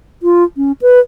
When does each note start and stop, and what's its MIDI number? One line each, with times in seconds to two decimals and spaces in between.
0.23 0.44 65
0.57 0.72 61
0.82 1.00 71